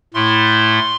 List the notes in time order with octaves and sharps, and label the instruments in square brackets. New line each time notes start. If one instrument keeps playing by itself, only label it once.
[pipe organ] A2 A3 E4 C6